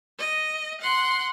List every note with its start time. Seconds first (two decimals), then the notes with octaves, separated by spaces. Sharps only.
0.19 D#5
0.81 F#5 C6